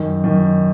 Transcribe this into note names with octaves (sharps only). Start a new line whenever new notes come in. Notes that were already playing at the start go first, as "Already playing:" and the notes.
Already playing: F#2 D#3
F#2 D#3